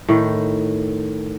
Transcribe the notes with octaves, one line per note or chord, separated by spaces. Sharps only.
A2 D#3